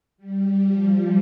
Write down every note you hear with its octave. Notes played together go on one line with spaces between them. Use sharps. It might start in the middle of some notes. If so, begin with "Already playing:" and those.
G3
F3